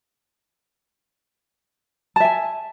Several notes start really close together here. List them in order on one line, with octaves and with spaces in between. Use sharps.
A5 E5 G#5